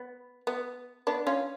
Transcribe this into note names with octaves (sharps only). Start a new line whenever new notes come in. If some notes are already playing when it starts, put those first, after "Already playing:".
Already playing: B3
B3
B3 D4
C#4 F4